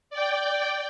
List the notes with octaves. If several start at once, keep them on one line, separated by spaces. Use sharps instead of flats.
D5 G5